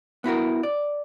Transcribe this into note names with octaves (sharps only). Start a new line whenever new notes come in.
B3 E4 F#4 A#4
D5